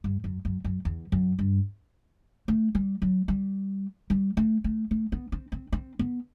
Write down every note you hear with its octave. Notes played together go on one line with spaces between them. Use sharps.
G2
F#2
F#2
F#2
E2
F#2
G2
A3
G3
F#3
G3
G3
A3
A3
A3
B3
C4
C4
C4
B3